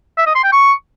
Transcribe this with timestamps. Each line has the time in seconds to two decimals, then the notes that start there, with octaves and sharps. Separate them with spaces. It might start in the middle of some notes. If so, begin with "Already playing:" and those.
0.18 E5
0.27 D#5
0.35 C6
0.44 G5
0.53 C#6